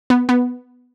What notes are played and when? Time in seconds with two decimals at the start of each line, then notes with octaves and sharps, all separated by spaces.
0.10 B3
0.29 B3